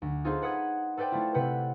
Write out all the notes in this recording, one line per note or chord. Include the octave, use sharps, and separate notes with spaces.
D2
D#4 F4 G#4 A4 B4 C5
B4 F#5 B5 D#6 G#6
A4 B4 C5 D5 G5
A3 E4 F4
C3 B4 F#5 G6